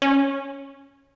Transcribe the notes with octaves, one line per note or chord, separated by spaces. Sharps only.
C#4